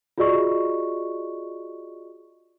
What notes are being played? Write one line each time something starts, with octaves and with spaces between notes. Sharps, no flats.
F4 F#4 G#4 D5 D#5 C#6